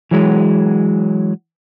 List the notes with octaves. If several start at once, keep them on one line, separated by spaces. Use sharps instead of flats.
E3 F#3 G#3